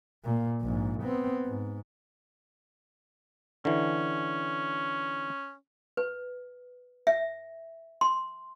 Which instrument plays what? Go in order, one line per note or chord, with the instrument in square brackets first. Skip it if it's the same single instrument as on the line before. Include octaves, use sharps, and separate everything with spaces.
[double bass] A#2
A#1 G#2
B3 C4
G#2
[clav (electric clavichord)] D3 E3 [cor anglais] C#4
[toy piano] B4
E5
C6